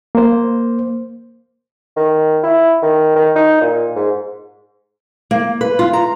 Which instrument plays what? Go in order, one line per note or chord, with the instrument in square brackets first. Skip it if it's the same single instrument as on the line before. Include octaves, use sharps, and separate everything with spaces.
[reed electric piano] A#3 C5
[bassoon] D#3
E4
D#3
D#3
D#4
A#2
G#2
[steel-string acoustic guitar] A#3
B4
F4
A#5